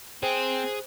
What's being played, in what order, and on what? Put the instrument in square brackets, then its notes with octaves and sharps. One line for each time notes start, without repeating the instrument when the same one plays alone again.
[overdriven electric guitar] C4 [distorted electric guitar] G#4 [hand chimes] C5